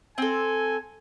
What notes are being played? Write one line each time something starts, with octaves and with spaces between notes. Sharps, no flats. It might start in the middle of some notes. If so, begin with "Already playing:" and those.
C4 A4 G#5